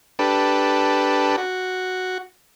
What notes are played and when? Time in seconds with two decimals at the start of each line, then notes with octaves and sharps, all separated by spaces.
0.19 D4 G4 A4 B4
1.38 F#4